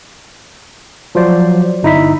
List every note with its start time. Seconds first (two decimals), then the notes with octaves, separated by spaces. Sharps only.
1.15 F3 F#3 C5 D5
1.83 G1 D#4 E4 B6